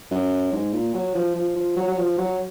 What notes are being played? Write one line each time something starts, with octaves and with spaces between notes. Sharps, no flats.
F#2
G#2
A#2
F#3
F3
F3
F3
F#3
F#3
F3
F#3